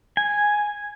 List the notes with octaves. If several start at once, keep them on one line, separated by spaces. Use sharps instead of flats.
G#5